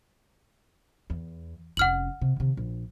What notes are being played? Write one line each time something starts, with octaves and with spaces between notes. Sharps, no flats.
E2
F1 C#4 F#5 F6 F#7
C3
C3 D#3
A#1